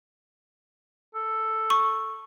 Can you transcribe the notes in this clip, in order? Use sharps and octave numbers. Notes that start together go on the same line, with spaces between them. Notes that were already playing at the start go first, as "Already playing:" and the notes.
A4
C#6